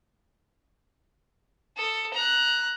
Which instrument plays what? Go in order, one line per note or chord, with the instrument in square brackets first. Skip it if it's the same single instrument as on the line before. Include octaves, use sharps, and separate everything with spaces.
[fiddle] A4 D#6
A#5 F#6